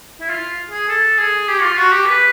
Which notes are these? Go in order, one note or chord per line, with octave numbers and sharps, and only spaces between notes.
E4
F4
G#4
A4
G#4
G4
F4
F#4
G4
B4